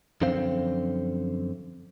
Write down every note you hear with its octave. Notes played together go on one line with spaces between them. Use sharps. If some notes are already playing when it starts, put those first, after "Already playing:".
F#2 D3 F3 C4 C5 F5